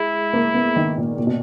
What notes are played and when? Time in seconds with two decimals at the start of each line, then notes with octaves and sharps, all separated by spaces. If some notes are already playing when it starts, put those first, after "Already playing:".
Already playing: G#3 E4
0.33 A#3
0.54 B3
0.76 D#3
0.97 A#2
1.18 A#2
1.27 B2